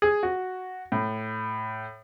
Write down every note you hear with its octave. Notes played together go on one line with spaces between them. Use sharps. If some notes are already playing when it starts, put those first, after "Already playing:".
G#4
F#4
A2